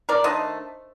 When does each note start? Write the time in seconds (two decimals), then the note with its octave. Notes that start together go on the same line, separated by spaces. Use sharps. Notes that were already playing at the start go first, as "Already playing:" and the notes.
0.09 A#4 D5
0.24 D#3 A3 D4 C5 D#5